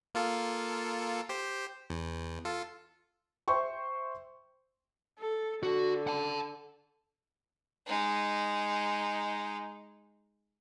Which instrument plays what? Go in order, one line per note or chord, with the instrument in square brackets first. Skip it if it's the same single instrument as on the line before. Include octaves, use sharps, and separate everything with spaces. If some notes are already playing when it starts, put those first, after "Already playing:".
[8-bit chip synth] A#3 F4 A4
G4 C5
E2
F4 A4
[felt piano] C5 E5 G5 C6 C#6
[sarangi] A4
[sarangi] D3 [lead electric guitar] F#4
[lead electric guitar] F#5 A5
[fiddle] G#3 D#4